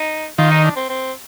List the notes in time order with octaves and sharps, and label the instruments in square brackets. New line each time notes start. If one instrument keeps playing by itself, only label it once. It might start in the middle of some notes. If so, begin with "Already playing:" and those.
Already playing: [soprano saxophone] D#4
[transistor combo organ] D#3 [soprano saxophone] F4
[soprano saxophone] D#4
D4
C4
C4